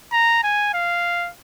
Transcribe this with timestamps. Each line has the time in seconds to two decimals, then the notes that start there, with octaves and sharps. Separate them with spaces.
0.12 A#5
0.43 G#5
0.74 F5